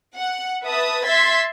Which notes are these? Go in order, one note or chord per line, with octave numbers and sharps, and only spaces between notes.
F#5
B4 E5 A5 D#6
E5 C6 G#6 A6 B6